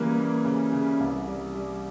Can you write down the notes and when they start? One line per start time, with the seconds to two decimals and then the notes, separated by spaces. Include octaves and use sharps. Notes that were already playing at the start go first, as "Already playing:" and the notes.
Already playing: C#3 E3 G3 A#3
0.18 A#3
0.45 C#3
0.72 C#3
1.00 C2
1.27 G3
1.55 G3